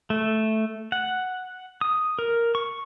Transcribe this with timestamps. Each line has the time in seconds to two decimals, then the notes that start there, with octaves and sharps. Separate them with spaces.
0.10 A3
0.92 F#5
1.81 D#6
2.19 A#4
2.55 C#6